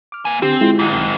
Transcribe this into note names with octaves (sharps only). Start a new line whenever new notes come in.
D6 F6
A#3 G#5
D3 C4 G4
G#3 E4 F4
G#2 D#3
B1